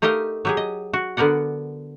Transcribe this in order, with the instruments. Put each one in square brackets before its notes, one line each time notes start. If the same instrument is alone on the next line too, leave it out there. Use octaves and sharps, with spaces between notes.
[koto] A3 D#4 G4 A#4 D#5 F5
F#3 G4 G#4
D#5
F#4
D3 B3 A#4 D5 F#5